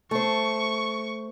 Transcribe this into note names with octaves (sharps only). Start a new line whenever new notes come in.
A3 C5 C#6